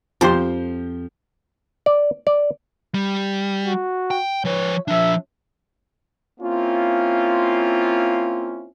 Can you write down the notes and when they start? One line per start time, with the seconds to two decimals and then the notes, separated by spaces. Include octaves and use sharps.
0.21 F2 F3 G4 C5 C6
1.86 D5
2.27 D5
2.94 G3
3.65 F#4
4.11 G5
4.45 F3 B4 C#5
4.88 F3 D4 E5
6.40 A#3 C4 C#4 E4 F4